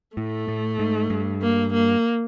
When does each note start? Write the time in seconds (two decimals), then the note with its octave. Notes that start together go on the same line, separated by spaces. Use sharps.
0.16 A2 A3
0.48 A2
0.79 G#2
1.10 G2
1.42 A#3
1.73 A#3